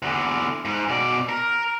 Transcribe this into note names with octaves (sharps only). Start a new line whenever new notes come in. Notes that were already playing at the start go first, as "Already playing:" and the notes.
E2 D3
G#2
B2 D5
A#4